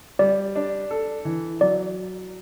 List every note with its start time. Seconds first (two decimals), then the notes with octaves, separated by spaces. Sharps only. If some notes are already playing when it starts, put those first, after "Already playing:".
0.19 G3 D5
0.56 D4
0.91 A4
1.25 E3
1.61 F#3 D5